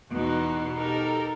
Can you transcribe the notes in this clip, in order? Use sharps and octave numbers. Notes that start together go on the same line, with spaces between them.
E2 B2 D#4 F#4
D#4 G4 A4 A#4